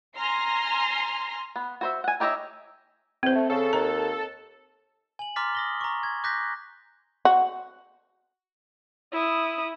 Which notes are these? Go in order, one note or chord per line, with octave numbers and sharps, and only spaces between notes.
G#5 A#5 C6 F6 A#6 C7
B3
F#4 C5 E5
F#5 G#5
D#4 G4 C#5 D#5 E5
E2 C4 C5
A3
C#3 A4
D#2 A#5
G#5 F#7
A#5 C6 D6 F6 A6 B6
D#6 A#6 G7
A#5 C#6
G#6
D6 F#6 G6 A#6 B6
F#4
E4 D#6